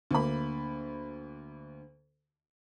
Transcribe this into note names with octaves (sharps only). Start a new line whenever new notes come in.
D2 A#3 B5